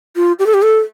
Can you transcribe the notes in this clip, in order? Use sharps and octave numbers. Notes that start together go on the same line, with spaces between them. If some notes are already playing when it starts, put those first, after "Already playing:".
F4
G4
A4
G4
A4